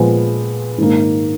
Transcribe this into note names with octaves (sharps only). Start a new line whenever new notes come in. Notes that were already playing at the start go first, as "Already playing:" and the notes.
Already playing: A#2 F3 G#3 B3
G#2 D#3 A#3 D#4